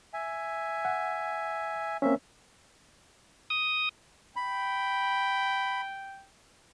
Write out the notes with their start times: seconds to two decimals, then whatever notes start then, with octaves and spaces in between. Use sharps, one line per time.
0.13 E5 G#5
0.85 F#5
2.02 A#3 C4 C#4 E5
3.50 D#6
4.36 G5 B5